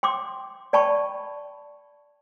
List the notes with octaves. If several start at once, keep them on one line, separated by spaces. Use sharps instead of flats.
G5 C6 D6
D5 G5 A5 B5 C#6